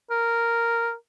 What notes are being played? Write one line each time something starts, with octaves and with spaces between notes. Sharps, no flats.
A#4